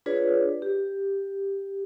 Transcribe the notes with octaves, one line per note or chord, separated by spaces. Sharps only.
D4 F4 G#4 B4 C#5 D5
G4